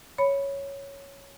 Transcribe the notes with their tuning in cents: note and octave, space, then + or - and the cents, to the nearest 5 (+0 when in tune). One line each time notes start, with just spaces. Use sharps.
C#5 +0 B5 +0